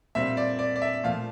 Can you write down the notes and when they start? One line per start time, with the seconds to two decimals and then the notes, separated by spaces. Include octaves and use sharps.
0.15 A#2 G3 C4 E5
0.37 D5
0.59 D5
0.76 D5
0.82 E5
1.03 A#2 F3 A3 F5